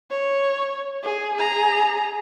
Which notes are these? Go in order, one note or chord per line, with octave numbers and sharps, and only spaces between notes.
C#5
G#4
G#4 A#5